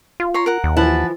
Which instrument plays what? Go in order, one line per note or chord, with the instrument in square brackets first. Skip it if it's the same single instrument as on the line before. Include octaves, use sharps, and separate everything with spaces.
[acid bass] F4
[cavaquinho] C#5 A#5 C6
A#4 F#5
[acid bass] D#2
[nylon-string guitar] E3 F3 E4 [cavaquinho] B4 F#5 A5